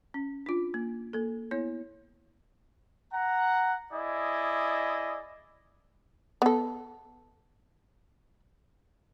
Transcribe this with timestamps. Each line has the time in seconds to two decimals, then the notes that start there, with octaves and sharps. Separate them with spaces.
0.14 C#4
0.46 D4 F4
0.74 A#3
1.13 A#3 A4
1.51 B3 E4 C#5
3.12 F#5 A#5
3.92 E4 G#4 D5 D#5
6.42 B3 A4